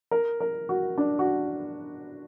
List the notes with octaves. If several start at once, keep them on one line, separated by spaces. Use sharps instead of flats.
A#4
A#4
F#4
D4
F#4